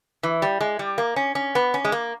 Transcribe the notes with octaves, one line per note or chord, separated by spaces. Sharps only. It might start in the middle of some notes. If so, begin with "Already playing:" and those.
E3
G3
G#3
G3
A#3
C#4
C#4
B3
C#4
G#3
A#3